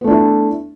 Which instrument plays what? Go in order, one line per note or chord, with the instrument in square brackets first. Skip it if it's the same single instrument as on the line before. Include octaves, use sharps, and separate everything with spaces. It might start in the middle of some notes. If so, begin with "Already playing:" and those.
[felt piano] B3
A3
D4
E4